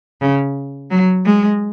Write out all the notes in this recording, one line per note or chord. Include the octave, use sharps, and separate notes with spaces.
C#3
F#3
G#3